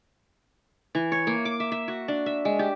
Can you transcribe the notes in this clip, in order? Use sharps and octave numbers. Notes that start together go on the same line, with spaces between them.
E3
C#5
A#3
D6
E5
E5
F#4
D4
E5
G#3
G4